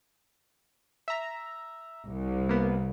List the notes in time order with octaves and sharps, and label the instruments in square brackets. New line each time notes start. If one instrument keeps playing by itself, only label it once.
[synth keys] E5 A#5
[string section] C2
[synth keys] A#3 B3